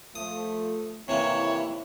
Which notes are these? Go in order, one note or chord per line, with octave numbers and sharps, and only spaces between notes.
F3 A3 D#6
D#2 C3 E3 A#3 E4 C#5